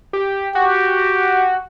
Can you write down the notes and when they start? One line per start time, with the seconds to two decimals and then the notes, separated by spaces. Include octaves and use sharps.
0.13 G4
0.55 F#4 G4